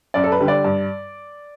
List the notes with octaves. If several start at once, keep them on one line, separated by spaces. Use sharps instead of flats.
F#2 D5
A4
B4
D3 G3
D5
G2